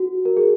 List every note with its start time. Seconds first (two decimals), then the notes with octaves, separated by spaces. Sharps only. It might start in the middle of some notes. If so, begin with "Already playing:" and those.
Already playing: F#4
0.25 A#4
0.37 G#4